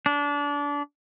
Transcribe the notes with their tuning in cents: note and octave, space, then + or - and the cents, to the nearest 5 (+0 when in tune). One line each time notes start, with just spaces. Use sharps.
D4 -25